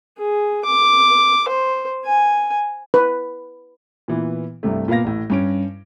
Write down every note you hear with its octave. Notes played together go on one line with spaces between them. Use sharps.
G#4
D6
C5
G#5
B4
A#2 E3 B3
C2 G2 C3 A3
A#2 A#3 B3 F5 A#6
A1 A2
G2 C#4 D7